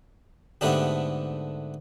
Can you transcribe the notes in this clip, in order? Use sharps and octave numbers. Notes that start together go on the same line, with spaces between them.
G#2 D3 A3 B3 D4 G4